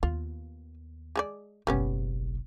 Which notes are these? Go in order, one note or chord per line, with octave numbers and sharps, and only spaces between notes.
D#2 B3 F4
G#3 G#4 D5
F#1 B1 G3 B3 C#4